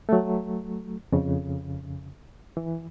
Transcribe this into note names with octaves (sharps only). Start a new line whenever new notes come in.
F#3 A3
F2 C#3
E3